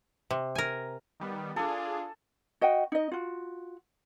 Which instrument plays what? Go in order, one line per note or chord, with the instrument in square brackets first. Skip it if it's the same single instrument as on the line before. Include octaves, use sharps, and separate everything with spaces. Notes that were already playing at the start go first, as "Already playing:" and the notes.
[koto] C3
A#4 G#5
[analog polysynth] D#3 G3 B3
[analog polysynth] D4 G#4 [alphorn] F4 [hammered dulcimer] A4
[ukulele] F#4 D#5 F#5 G5
D#4 D#5
F4 F#4